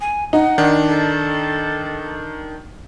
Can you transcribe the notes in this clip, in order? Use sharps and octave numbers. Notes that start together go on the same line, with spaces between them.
G#5
D#4 F#5
D#3 D4
A4